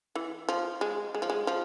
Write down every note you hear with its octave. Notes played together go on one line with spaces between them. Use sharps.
E3
F3
G#3
G#3
F3
G#3
F3